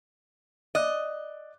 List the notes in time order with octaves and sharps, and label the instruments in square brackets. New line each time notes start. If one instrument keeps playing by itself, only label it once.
[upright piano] D5 D6 F#6 [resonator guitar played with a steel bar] D#5